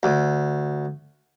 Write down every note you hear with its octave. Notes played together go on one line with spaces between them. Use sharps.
D2